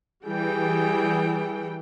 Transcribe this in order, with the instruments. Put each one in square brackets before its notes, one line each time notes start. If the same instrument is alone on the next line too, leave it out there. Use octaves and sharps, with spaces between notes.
[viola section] E3 G3 G5 [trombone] G#4